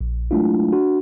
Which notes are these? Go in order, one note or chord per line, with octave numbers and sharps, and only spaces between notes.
A#1
F#3 G#3 A3 D4 E4 F4
D4 F#4